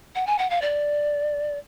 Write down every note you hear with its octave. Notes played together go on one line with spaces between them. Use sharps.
F#5
G#5
F#5
F5
D5